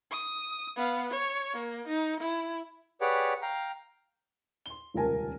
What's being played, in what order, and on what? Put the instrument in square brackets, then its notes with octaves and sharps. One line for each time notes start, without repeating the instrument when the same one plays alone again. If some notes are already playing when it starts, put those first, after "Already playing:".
[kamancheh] D#6
B3 F5
C#5
A#3
D#4
E4
[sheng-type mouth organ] G4 G#4 B4 C#5 D5 F#5
F5 G5 A#5
[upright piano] C6 G7
D#1 C#2 C3 A#4 G#5 A5